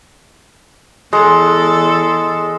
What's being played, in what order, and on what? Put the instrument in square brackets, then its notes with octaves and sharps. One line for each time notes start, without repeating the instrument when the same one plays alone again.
[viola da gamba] E2 A4 [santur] G#3